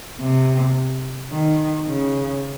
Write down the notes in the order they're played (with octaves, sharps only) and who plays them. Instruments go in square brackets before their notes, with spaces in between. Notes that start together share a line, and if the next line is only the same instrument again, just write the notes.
[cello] C3
D#3
C#3